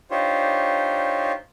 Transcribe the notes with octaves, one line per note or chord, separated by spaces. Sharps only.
D4 D#4 F4 G4 C5 C#5